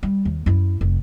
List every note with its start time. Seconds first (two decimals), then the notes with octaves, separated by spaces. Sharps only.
0.03 G3
0.25 D#2
0.46 F#2 E4
0.81 F1